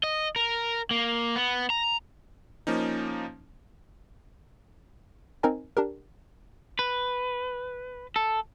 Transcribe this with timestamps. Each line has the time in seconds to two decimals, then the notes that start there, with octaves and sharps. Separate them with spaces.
0.04 D#5
0.36 A#4
0.91 A#3
1.36 B3
1.70 A#5
2.67 F3 A#3 C#4 D#4
5.43 C4 D#4 A#4 D#5 G#5
5.77 D4 G4 A#4
6.79 B4
8.16 A4